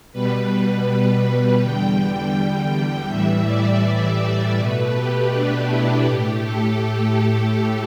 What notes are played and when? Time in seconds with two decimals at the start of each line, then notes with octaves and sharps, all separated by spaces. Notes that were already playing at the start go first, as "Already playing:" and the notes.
0.12 B2 G3 B4
1.61 E2 D3 G3 G5
3.09 A2 E3 G3 E5
3.47 D5
4.57 B2 A3 B4
4.95 G4
5.32 D4
5.69 E4
6.06 A2 A3 G4
6.43 A4